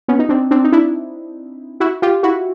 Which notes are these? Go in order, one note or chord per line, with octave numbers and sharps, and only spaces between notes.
B3 C#4
D#4
C4 D4
C4 D4
D#4
D4 E4
E4 F#4
F4 G4
E4 F#4